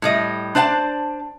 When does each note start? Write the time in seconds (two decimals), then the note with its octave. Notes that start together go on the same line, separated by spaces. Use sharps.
0.02 A2 G3 D#5
0.55 D4 C5 D5 F5 A5